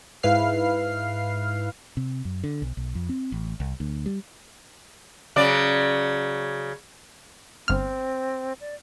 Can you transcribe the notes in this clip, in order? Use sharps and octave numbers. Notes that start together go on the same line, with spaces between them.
G#2 E4 B4 F5 F6 C7
C3
F#2
D3
B1
B1
F2
C4
A1
C2
D2
G3
C#3 F#3 D5
G1 C4 F6
D5